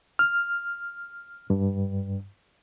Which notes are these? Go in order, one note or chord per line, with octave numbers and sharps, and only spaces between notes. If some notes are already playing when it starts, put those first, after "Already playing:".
F6
G2